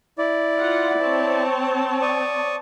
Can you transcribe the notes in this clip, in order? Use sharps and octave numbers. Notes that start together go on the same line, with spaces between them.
E4 D5
F4 F#5
C4 C#5 A5
D5 C#6 D#6